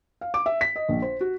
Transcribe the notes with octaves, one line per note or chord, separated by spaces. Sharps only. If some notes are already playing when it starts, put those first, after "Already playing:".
F5
D6
E5
B6
D#5
A#1
C5
F#4